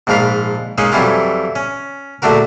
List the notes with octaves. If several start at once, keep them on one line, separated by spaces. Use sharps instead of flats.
A#1 G#2 F3 A#4 F5 B5
G#3 A#3 C#4 D#4 G#4
F2 E3 F#3 G3 E4 F4
C#4
A#1 D3 A3 D4 F#4 A#4